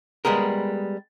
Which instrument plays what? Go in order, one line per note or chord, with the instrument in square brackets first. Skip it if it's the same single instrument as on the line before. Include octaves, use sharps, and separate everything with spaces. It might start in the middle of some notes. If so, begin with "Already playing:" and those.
[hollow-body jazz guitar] G3 G#3 B3 G#4 A#4